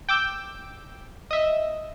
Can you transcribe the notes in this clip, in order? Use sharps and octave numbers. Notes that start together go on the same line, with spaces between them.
G5 D6 E6 G6
D#5 E5